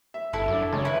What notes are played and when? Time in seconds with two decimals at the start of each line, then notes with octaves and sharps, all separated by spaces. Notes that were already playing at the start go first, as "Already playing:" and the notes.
0.14 E5
0.33 G1 E4 A4
0.48 F#2 D4 F#4
0.73 G#1 C#3 C#5 A5
0.85 E4 B4